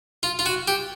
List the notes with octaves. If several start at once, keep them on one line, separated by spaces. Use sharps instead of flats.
F4
F4
F#4
G4